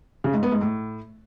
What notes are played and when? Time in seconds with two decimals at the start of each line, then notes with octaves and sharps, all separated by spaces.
0.24 C#3
0.33 G#2
0.43 B3
0.52 G#2
0.61 A2